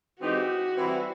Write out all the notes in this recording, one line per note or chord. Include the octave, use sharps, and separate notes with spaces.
E3 G#3 C4 D#4 F#4 G4
E3 G3 C4 E4